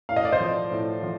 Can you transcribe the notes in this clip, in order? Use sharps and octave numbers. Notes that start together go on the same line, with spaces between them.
A2 F5
D#5
D5
C5 D#5
F3
A2
F3